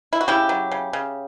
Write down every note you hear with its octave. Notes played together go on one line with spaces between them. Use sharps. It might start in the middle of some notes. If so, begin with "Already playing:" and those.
E4
F#4
C#3 E4 G4
F#3
C#3
C#3